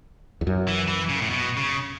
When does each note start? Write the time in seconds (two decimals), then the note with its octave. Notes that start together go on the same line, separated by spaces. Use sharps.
0.41 E2
0.47 F#2
0.68 E3
0.88 E3
1.09 C#3
1.21 A2
1.30 B2
1.57 C#3